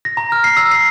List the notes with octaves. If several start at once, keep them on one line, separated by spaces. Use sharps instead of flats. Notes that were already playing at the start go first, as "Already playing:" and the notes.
A#6
A#5
F6
C7
E6
C7